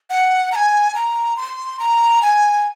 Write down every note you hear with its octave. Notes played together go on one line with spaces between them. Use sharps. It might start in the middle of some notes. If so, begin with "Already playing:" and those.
F#5
A#5
G#5
A#5
C6
A#5
G#5